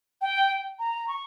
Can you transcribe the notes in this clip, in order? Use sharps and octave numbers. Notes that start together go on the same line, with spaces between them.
G5
A#5
C#6